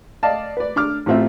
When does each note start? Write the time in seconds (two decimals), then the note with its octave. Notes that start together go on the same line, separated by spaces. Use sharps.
0.23 D5 D#5 F5 A5
0.57 B4 D5
0.76 D4 D6 F6
1.06 A1 A2 A3 C4 F4 E5